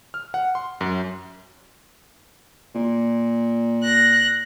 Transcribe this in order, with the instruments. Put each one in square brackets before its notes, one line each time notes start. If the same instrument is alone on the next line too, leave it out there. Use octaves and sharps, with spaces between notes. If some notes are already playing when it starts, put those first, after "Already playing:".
[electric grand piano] F6
F#5
C6
F#2
[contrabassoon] A#2
[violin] F#6 A#6